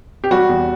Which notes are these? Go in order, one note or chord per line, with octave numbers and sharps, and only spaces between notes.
G4
G3 F#4
E2